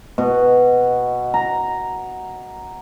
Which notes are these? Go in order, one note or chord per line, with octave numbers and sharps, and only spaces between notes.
B2
A#5